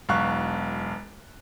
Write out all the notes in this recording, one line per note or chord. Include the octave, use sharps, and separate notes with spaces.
E1 B1 F5 C#6 F#6